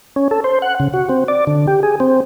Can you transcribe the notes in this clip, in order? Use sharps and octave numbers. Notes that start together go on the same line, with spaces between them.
C#4
A4
C5
F#5
C#3
F#4
C4
D5
D3
G4
G#4
C4